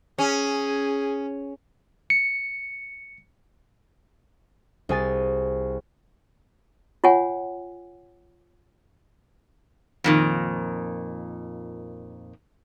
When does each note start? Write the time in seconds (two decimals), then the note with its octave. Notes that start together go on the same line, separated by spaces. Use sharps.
0.19 C#4 G#4
2.10 C#7
4.89 C2 G#4 G#5 A6
7.04 F4 C#5 F#5 G#5
10.04 F2 A#2 D#3